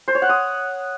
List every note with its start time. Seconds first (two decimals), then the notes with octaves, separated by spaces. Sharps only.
0.08 C5
0.15 C#5
0.22 F#5
0.29 D#6